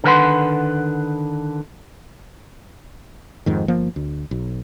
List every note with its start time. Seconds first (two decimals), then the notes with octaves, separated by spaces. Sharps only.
0.04 D3 D#3 A#4 B4 F#5 C6
3.46 F2 G#2 D#3
3.68 G1 F3 A#3
3.96 D2
4.31 B1